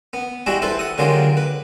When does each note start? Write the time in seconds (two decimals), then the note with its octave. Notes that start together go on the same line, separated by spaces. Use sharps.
0.13 B3
0.46 G3 G#3 E4 F#4 G4
0.62 E4 A4 B4 C5
0.79 F#5 D#6
0.98 D3 F#3 G#3 A#3 F4 G4
1.37 B4